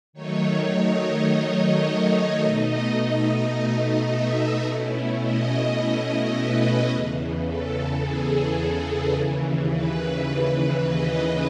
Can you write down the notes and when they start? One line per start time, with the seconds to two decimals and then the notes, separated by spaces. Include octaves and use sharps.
0.13 D#3 F#3 A3 D#4 C#5
0.70 D#5
0.98 D#5
1.26 D#5
1.83 D#5
2.38 B2 A3 D#4
4.08 E5
4.63 B2 A3 C#4 E4
5.20 D#5
6.33 B4
6.89 E2 C#3 E3
7.45 A4
8.01 G#4
9.14 D#2 C#3 E3
9.70 B4
10.82 D#5